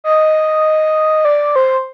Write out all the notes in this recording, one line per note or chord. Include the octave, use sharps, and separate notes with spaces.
D#5
D5
C5